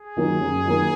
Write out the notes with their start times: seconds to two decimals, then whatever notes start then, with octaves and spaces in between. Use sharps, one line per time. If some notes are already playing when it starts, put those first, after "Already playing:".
Already playing: G#4
0.17 D#3 F#3 A#3
0.41 F#2
0.65 D#3 F#3 A#3